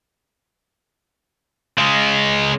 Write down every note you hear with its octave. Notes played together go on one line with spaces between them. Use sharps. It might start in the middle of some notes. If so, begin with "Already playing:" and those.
C#3 G#3